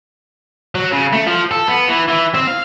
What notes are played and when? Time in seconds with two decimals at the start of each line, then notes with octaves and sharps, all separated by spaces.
0.75 F#3
0.92 C#3
1.12 A3
1.26 F3
1.51 A4
1.68 B3
1.88 E3
2.08 E3
2.35 C4
2.47 F5